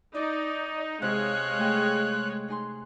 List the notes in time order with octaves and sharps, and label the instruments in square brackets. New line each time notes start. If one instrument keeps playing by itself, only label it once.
[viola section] D#4 [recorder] D5
[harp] C3 [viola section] G#3 C#5 F5 [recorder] F#6
[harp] A3 G#4 G5
D#4 G#4 C6